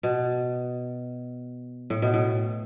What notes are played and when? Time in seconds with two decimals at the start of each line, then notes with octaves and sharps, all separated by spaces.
0.03 B2
1.90 A2
2.02 B2
2.14 A2